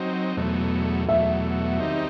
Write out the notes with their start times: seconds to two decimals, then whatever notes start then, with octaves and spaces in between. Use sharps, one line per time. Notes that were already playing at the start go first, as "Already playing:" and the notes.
Already playing: F#3 C4 D#4
0.37 E2 B2 F#3 A3
1.08 E2 B2 F#3 A3 E5
1.79 D#3 G3 C4 D#4